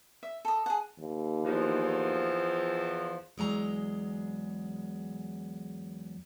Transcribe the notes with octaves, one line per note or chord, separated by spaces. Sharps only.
E5
A4 D#5
G#4 F#5
D#2
E2 F3
E2 F#3 G#3 A#5